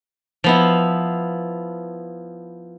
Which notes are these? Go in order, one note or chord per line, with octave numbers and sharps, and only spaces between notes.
F3 B3 E4